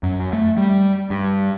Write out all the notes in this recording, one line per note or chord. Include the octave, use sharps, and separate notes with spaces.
F#2
A3
G3
G2